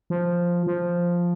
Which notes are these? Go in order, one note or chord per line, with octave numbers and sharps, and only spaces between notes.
F3
F3